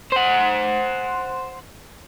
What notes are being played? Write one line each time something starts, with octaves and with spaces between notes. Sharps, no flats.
C5 F#5